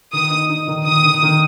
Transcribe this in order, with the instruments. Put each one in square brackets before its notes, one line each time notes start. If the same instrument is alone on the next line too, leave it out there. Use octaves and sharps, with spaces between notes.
[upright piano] D#3 [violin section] D#6
[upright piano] D#4
D#4
D#3
[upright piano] D#3 [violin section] D#6
[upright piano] D#3
D#3